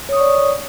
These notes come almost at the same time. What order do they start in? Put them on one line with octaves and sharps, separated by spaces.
C#5 D#6 C#6 D5